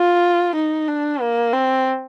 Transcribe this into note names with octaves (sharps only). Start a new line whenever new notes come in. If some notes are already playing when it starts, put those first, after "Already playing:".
Already playing: F4
D#4
D4
A#3
C4